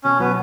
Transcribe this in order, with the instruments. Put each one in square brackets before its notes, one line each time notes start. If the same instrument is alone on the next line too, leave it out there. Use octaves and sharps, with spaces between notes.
[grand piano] B2 [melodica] C#4
[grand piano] F#3 [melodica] B3